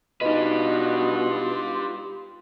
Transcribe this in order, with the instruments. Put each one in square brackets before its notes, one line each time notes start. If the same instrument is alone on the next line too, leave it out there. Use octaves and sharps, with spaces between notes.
[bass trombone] B2 [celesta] D#4 D#5 [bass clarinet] F4 [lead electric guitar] G4 B4